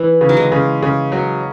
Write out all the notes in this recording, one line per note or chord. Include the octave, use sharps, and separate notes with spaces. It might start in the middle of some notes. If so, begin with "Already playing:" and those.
Already playing: E3
C#3
F#3
G#3
C#3
C#3
F#3